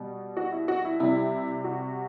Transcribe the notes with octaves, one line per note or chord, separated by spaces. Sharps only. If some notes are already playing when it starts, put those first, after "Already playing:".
Already playing: B2 G3
F#4
E4
F#4
E4
C3 G3 E4
F#4